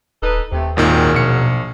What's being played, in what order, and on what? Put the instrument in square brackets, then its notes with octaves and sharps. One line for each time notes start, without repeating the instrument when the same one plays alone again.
[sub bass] D#1 [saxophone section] D#4 A4 B4
[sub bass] D#2 [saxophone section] C3 A3
[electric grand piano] G#1 A#2 D#3 [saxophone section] F#3 G#4 A#4
[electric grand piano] A#1 C#7 [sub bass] B2